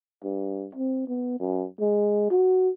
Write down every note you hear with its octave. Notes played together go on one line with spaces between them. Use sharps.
G2
C4
B3
F#2
G#3
F#4